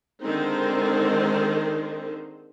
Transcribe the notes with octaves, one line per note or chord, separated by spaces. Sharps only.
D3 D#3 G#3 C4 D#4 C5